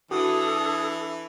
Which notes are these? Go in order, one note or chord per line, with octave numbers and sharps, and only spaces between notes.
E3 D4 E4 F#4 A4 D#6